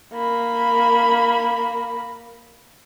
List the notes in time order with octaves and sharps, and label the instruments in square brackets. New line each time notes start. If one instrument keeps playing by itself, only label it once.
[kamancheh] A#3 B5